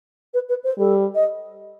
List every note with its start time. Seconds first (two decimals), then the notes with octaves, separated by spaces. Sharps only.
0.33 B4
0.49 B4
0.63 C5
0.78 G3 A4
1.14 D#5